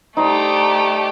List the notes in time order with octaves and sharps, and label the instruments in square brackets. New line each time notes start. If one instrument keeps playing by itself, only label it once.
[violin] A3 G4 [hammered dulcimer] D#4 C5 D5